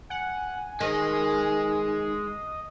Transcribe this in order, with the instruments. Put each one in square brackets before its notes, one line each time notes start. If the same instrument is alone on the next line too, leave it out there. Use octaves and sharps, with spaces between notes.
[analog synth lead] F#5 [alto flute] G#5
[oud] D#3 [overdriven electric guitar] G#3 [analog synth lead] D#5